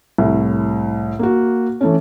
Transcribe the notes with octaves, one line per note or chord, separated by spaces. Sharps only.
C2 A2
A#3 F#4
E3 A3 C#4